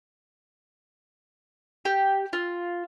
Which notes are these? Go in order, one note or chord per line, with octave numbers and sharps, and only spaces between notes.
G4
F4